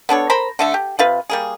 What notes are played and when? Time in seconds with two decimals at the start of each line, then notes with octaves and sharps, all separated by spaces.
0.09 B3 D4 A4 C#5
0.30 A#4 C5 A#5 B5
0.59 D3 A3 E5
0.74 G4
0.99 C3 F4 B4
1.30 G3 A#3 G#4